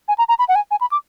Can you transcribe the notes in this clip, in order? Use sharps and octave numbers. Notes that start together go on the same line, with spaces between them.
G#5
A#5
A#5
B5
F#5
G#5
G#5
B5
D6